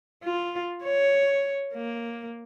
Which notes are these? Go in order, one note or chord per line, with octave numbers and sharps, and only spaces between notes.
F4
C#5
A#3